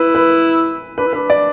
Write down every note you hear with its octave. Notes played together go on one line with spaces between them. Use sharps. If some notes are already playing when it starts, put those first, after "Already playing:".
Already playing: E4 B4
B4
D4 B4
E4
D4 B4
D5